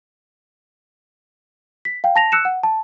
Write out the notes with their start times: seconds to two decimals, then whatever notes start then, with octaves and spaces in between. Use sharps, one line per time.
1.85 B6
2.04 F5 G5
2.16 A5 A#6 F7
2.32 E6 F#6 C#7 E7
2.45 F#5
2.63 A5